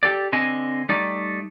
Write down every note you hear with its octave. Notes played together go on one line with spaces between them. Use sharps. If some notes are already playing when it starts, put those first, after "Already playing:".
G4 A4 D5
D3 C4 D#5 G#5
G3 A3 D#4 D5